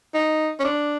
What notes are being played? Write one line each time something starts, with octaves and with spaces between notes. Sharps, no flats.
D#4
C#4
D4